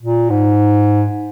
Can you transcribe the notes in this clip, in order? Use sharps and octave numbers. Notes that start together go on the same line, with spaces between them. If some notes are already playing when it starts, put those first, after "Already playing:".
A#2
G#2